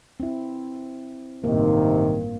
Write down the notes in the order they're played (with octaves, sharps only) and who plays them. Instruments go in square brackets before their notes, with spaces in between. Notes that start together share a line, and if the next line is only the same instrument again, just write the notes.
[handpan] C4 E4
[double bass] A1 G2 [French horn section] C3 D#3 [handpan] A#3